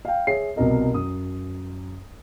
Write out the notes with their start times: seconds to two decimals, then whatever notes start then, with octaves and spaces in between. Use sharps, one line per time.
0.05 F5 G5
0.27 G#4 C#5 E5 C7
0.56 C2 B2 A#4 D#5
0.93 F#2 D#6